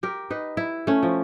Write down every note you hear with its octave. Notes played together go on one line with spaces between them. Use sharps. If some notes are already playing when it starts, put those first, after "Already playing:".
G4 A#4
D#4 B4
E4
A3 C#4
F3